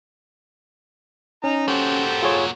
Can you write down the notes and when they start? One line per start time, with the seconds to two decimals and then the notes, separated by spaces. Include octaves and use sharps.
1.44 C#4 D#4 A#5
1.68 A#3 F#4 G4 A4 C5
2.22 F4 G#4 C#5